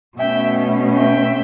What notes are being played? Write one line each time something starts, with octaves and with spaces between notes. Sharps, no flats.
B2 A3 C#4 E5 G5
E5 G5